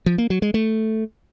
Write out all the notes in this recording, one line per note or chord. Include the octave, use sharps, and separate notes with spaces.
F3
A#3
F#3
G#3
A3